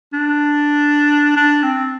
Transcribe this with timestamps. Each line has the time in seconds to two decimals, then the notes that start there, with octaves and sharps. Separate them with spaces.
0.13 D4
1.36 D4
1.64 C4